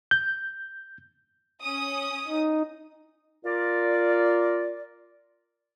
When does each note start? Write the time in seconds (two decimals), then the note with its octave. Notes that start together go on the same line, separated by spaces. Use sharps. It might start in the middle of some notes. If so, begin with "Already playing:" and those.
0.11 G6
1.63 C#4 D#6
2.28 D#4
3.45 F4 A#4 D5